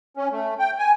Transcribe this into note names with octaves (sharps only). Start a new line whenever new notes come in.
C#4
A3
G5
G#5